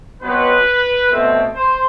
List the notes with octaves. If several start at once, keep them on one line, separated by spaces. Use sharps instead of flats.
B2 F#3 C4 B4
B2 A3 C4
C5